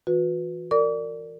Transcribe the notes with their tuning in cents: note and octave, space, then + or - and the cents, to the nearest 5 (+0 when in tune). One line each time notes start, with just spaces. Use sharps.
E3 +0 F#4 -40 B4 +0
A#4 -30 D5 +0 D6 -45